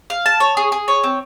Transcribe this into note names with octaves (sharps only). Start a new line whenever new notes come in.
F5
A5
C#5
G#4
G#4
C#5
C4